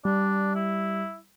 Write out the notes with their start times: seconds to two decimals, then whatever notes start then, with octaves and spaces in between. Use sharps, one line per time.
0.05 G3 D4
0.55 E4